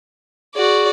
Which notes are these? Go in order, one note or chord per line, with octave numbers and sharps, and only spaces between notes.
F#4 G#4 D5 C#6